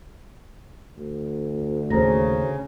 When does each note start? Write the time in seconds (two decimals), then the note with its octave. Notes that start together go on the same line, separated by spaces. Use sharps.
0.97 D2
1.90 D#2 A2 C#3 C5 A#5 A#6